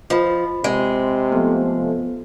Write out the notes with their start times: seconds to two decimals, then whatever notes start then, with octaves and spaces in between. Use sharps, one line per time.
0.10 F3 D#5 B5
0.64 C3 G#3
1.32 F3 A3 B3